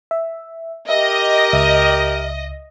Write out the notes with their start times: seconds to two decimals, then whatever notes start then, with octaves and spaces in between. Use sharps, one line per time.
0.11 E5
0.89 G4 A#4 D#5 E5
1.53 C#2 E5